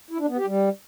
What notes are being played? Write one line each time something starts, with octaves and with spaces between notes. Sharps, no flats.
E4
D4
B3
G4
G3